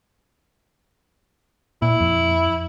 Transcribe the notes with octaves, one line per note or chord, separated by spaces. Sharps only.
A#2 E4
F2